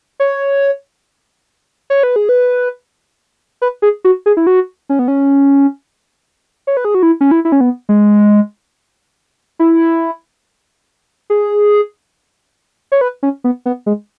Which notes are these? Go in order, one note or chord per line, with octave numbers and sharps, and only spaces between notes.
C#5
C#5
B4
G#4
B4
B4
G#4
F#4
G#4
E4
F#4
C#4
B3
C#4
C#5
B4
G#4
F#4
E4
C#4
E4
E4
C#4
B3
G#3
E4
G#4
C#5
B4
C#4
B3
B3
G#3